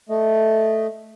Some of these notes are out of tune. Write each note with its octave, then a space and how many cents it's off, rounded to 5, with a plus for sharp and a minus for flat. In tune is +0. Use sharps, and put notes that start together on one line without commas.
A3 +0 D#5 +0